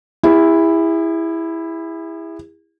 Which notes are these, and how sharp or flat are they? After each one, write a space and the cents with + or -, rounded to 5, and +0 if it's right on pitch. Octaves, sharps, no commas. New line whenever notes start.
E4 +0 G#4 -40